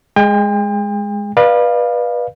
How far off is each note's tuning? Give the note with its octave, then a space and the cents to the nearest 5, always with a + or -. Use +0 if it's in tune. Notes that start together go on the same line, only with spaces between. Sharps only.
G#3 +0 G5 +40
B4 -25 D5 +40 F5 +0